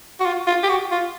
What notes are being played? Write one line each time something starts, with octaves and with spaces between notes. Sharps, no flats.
F#4
F4
F4
G4
F#4
F4